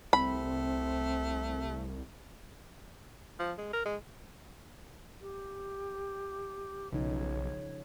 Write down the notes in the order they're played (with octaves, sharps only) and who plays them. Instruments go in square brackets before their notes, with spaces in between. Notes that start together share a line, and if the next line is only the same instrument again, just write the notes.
[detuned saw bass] C2 [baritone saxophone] A3 [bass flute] C4 [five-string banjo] B5
[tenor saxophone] F3
G#3
A#4
G#3
[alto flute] G4
[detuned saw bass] B1 [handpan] C#3 F3 D#4 [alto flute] C#5